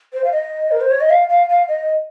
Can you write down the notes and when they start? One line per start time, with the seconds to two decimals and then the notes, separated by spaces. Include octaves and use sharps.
0.13 C5
0.24 F5
0.32 D#5
0.71 A#4
0.80 C5
0.90 C#5
1.00 D#5
1.10 F5
1.29 F5
1.49 F5
1.68 D#5